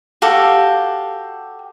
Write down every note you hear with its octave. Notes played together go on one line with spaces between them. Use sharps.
F#4 G4 A4 F5